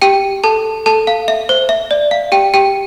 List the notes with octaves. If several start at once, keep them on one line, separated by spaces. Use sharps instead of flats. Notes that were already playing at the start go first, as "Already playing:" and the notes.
G4 G5
A4 A5
A4 A5
F5
E5
C5
E5
D5
F5
G4 G5
G4 G5